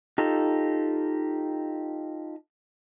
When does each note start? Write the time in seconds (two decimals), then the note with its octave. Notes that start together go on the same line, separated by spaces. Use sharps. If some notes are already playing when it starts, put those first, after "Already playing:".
0.18 D#4 F4 G4 A4